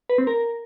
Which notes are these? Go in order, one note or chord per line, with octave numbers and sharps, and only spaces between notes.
B4
C4
A#4